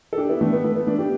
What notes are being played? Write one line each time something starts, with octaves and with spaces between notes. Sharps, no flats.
A4
D4 G4
B3 E4
A3 D4
B3
A3
B3
A3 D4
D4 G4